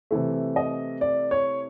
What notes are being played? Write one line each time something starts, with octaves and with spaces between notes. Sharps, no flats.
C3 E3 A3
D#5
D5
C#5